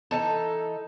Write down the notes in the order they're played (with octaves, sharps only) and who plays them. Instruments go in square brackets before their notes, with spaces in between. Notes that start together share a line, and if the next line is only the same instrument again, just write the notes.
[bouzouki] E3 D#4 A4